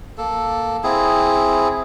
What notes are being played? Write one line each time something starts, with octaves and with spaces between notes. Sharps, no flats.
A#3 A4
C4 E4 G#4